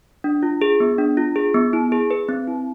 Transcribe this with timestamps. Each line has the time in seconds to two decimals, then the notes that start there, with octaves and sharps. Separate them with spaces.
0.24 D4
0.43 F4
0.62 G#4
0.80 B3
0.98 D4
1.17 F4
1.36 G#4
1.54 B3
1.73 E4
1.92 G#4
2.11 B4
2.29 C4
2.48 E4